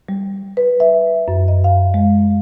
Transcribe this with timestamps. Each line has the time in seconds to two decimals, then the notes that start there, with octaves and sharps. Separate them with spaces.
0.09 G3
0.57 B4
0.80 E5
1.28 F#2
1.48 D#5
1.64 F5
1.94 G#3